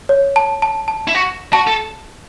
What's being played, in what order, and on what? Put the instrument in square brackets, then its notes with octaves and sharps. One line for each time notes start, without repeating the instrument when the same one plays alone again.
[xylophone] C#5
A5
A5
A5
[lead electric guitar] E4
F#4
[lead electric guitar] F#4 [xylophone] A5
[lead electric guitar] A4